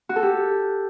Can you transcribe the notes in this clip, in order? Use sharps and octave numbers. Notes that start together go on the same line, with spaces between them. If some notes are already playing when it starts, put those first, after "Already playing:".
F#4
A4
G4